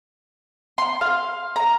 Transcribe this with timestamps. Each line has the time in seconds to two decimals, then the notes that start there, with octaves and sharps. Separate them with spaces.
0.78 C6
1.01 F5
1.56 A#5